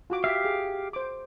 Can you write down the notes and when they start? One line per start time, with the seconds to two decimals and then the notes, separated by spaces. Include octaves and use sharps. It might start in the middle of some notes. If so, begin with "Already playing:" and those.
0.10 F4 F#4 D6
0.24 G4 E5 F5
0.44 G#4
0.93 C5 D6